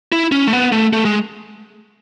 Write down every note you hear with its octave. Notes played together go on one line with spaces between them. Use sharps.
E4
C#4
A3
B3
A3
A3
G#3